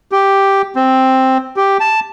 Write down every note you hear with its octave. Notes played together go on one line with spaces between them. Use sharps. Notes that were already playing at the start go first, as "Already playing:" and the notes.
G4
C4
G4
A5